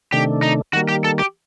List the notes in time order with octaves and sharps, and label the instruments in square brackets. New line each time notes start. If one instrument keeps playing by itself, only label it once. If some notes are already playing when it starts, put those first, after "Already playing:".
[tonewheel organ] C3 D#3 A3 D4 [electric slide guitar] G4
[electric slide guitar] D#4
[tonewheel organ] D#3 G3 A#3 [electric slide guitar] F#4
[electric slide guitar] G4
A4
G4